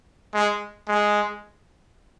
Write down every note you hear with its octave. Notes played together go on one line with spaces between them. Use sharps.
G#3
G#3